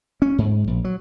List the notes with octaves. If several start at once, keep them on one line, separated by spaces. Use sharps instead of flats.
C#4
G#2
A#1
F#3